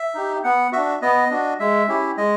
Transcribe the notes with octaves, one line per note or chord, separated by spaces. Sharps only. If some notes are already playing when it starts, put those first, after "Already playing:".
Already playing: E5
D#4 G4
B3 F#5
D4 F#4 E5
B3 D#5
D4 F#4
G#3 E5
C#4 E4 G4
G#3 D#5